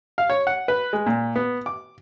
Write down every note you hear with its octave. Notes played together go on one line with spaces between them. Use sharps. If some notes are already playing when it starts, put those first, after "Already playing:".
F5
C#5
F#5
B4
G#3
A#2
B3
D6